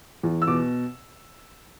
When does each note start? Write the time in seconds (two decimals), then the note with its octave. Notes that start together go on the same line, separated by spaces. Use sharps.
0.23 E2
0.42 E6
0.47 B2 D6